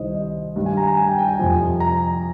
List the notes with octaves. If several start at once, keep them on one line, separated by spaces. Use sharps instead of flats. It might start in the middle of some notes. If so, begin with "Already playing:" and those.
Already playing: C2 C3 D#3 G3 C5 D#5
D#5
G2 D#3 G3
G#5
A#5
G#5
A#5
G#5
G5
G5
G#5
F2 C3 F3
A#5